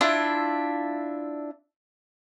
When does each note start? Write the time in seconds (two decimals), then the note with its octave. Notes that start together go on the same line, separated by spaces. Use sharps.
0.01 D4 E4 F4 E5